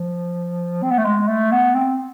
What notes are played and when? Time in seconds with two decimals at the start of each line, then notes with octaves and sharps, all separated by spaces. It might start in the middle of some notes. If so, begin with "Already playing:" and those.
Already playing: F3
0.83 C4
0.91 B3
0.98 A3
1.05 G#3
1.28 A3
1.52 B3
1.75 C4